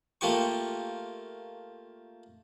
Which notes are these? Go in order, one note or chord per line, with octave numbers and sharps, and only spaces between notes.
A3 A#3 F4 G4 G5 C#6